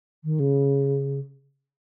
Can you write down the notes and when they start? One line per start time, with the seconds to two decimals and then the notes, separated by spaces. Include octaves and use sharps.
0.24 D#3
0.40 C#3